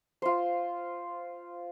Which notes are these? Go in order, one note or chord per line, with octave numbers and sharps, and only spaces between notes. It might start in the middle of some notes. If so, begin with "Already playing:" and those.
F4 C5